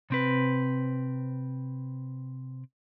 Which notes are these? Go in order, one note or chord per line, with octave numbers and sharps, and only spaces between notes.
C3 C4 B4